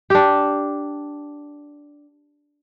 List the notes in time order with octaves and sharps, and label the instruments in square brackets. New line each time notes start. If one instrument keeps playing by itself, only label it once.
[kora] D4 G4